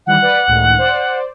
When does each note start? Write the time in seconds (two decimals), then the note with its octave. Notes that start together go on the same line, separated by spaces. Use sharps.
0.07 D#3 E3 G3 F#5
0.22 B4 D5
0.47 C#2 A2 D#3
0.78 C5 D5